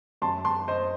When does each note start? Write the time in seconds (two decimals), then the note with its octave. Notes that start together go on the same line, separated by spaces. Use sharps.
0.22 F#2 A5 C6
0.45 F#2 A5 C6
0.68 F#2 C5 D#5